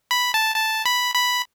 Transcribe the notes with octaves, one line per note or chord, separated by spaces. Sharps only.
B5
A5
A5
B5
B5